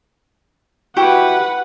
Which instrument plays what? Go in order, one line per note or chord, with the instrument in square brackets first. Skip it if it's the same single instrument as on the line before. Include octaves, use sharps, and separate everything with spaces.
[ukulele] E4 F#4 G4 [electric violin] B4 F#5